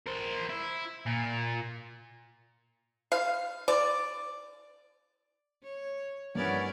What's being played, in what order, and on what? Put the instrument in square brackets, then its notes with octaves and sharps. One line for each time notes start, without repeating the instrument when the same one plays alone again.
[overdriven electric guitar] A#4 C5
E4
A#2
[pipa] F5
D5
[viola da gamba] C#5
[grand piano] G2 [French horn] B3 [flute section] C#4 F#5 G#6 [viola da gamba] E4 A#4 D5